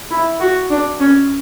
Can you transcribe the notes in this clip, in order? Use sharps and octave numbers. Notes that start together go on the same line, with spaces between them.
E4
F#4
D4
C#4